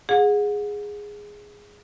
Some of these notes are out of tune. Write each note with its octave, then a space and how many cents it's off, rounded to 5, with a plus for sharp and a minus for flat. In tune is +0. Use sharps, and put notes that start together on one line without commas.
G#4 -5 F#5 -35